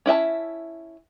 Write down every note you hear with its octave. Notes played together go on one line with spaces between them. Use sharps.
C#4 E4 E5 A5